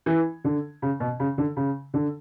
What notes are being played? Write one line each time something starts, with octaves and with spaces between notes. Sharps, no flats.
E3
D3
C#3
B2
C#3
D3
C#3
D3